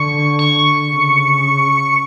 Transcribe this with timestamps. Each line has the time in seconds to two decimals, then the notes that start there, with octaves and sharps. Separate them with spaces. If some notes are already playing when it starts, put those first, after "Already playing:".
Already playing: D3 C#6
0.39 C#6
0.90 C#3